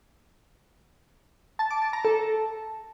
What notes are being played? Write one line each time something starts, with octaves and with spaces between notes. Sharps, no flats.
A5
D6
A5
A#5
A4